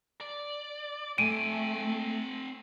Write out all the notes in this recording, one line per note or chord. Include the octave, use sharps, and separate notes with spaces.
D5
A3 C4 G#5 D7 D#7